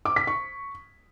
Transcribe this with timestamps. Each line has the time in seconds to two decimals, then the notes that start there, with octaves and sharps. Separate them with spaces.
0.05 D6
0.16 B6
0.27 C#6